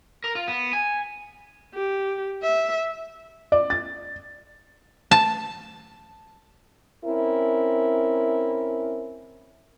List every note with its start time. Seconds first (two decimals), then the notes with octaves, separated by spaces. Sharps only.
0.24 A#4
0.35 F4
0.48 B3
0.73 G#5
1.74 G4
2.42 E5
3.52 D5
3.70 A6
5.11 A5
7.05 C4 C#4 E4 A#4